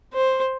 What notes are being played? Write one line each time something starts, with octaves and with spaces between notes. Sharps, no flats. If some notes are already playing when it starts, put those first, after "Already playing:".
C5